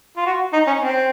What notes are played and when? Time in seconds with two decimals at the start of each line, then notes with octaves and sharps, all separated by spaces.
0.17 F4
0.26 F#4
0.53 D#4
0.67 C#4
0.80 C4